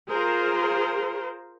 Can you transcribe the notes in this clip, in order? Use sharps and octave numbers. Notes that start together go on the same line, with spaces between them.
F4 G#4 A#4 C5